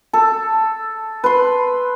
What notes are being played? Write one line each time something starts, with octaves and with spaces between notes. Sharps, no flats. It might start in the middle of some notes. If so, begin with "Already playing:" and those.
A4
B4 C6